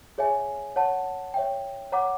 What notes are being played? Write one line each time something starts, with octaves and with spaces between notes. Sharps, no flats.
G#4 C#5 E5 G#5
C#5 F#5 A5
C#5 E5 G5
C#5 F#5 A#5 D6